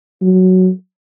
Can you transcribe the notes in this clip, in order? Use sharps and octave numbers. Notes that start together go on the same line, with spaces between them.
F#3